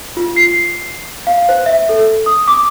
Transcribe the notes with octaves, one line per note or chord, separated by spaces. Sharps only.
F4
C7
F5
C5
E5
A4
D#6
D6